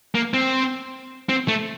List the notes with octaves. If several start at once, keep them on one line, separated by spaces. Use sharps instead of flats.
A#3
C4
C4
A3